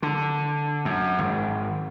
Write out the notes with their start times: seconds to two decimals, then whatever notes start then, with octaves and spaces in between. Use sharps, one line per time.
0.02 D3
0.85 F#2
1.19 G#1